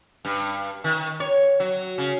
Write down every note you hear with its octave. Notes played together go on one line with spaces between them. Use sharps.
G2
D#3
C#5
F#3
C#3